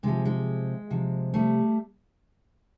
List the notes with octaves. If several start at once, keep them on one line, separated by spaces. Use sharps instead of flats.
C3 F3 G#3
G#3
C3 F3
G3 A3